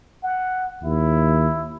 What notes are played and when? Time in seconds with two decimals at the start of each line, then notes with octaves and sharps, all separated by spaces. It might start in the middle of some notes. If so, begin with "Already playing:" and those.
0.24 F#5
0.84 D#2 E4